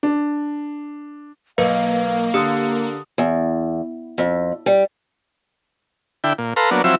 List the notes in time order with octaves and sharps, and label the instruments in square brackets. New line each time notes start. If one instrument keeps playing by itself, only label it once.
[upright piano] D4
[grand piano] B1 [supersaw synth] A#3 [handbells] B4 [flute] F5
[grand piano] D3 D#6 C#7 [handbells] G4
[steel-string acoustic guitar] E2
F2
G3
[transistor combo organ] D3 E4 G5
A#2
A4 B4 F5 A#5 C6
F#3 A#3 B3 D4
F3 F#3 C4 E4 E6